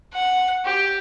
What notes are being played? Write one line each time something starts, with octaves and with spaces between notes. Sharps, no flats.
F#5
G4